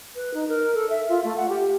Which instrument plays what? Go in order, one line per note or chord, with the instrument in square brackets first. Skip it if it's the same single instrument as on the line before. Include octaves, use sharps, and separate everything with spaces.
[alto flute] B4
D#4
A#4
A4
E5
F4
A3
F#5
G4